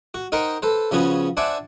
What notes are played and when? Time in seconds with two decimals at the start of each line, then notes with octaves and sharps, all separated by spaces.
0.14 F#4
0.32 D#4 A#4 C5 D#5 F#5 G5
0.62 A4 B4 C5
0.91 C#3 F3 B3 C#4 F#4 G#4
1.37 D4 C5 D5 E5 F#5 G#5